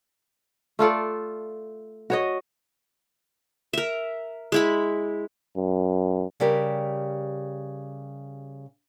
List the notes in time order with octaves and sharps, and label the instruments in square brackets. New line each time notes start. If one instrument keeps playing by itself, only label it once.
[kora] A3 F4 A4 D5
F#4 C#5 D#5
[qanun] A#4 E5
G#3 E4 B5
[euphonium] F#2
[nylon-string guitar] C#3 G3 G4 A#4